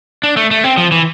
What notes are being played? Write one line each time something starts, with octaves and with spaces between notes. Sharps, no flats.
D4
A3
A3
C4
F3
E3